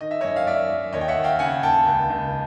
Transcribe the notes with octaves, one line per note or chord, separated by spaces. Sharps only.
D#3 D#5
E5
F#2 C#5 D#5
F5
F#2 D5 E5
F#2
D#2 C#5 D#5
G5
E5 F#5
D#2
F5 G5
C#3 F#5 G#5
D#2 G5 A5
C#2
C#2